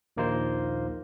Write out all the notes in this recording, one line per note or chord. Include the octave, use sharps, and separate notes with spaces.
A#1 D#2 A#3 D#4 F4 C5